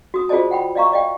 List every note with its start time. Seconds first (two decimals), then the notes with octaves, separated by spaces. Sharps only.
0.14 F#4 D#6
0.29 F4 G#4 C5 D5 D#5 A5
0.51 F#5 G5 B5
0.75 D5 D#5 F5 A#5 C#6
0.92 D5 D#5 F5 G5